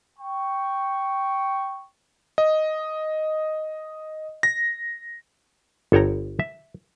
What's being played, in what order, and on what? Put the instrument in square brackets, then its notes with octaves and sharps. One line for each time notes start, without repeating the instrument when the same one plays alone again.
[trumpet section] G5 C#6
[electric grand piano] D#5
A#6
[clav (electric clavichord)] G1 A4 C#5 G5 A#5
E5